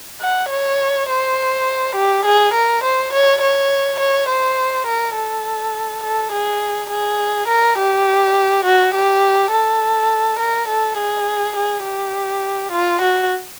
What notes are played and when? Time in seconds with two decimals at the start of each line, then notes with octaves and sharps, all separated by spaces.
0.21 F#5
0.50 C#5
1.09 C5
1.95 G4
2.25 G#4
2.54 A#4
2.84 C5
3.13 C#5
3.42 C#5
4.00 C#5
4.29 C5
4.87 A#4
5.16 A4
6.04 A4
6.32 G#4
6.90 G#4
7.48 A#4
7.78 G4
8.65 F#4
8.95 G4
9.52 A4
10.39 A#4
10.68 A4
10.97 G#4
11.56 G#4
11.84 G4
12.72 F4
13.01 F#4